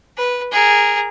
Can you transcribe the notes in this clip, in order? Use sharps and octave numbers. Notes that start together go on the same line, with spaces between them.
B4
G#4 A#4